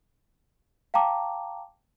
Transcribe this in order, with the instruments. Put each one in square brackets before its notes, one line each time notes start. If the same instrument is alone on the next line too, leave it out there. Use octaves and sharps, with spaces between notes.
[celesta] F5 G5 A5 A#5 D6